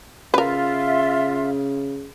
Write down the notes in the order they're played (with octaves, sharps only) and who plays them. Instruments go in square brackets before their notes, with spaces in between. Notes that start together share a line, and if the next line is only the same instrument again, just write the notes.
[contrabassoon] C#3 [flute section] F4 E5 [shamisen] A#4 B4